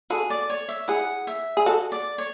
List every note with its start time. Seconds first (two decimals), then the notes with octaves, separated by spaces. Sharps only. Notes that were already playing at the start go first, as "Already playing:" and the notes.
0.10 F#4 G#4 A4
0.30 D5
0.50 C#5
0.69 E5
0.88 E4 G#4 F#5
1.27 E5
1.57 G#4
1.66 F#4 A4
1.92 D5
2.18 C#5